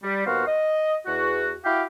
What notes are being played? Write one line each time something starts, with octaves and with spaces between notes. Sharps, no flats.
G3
D#2 B3 F#4 C5 F5
D#5
E2 F#4
E4 F#4 G4 F5 G5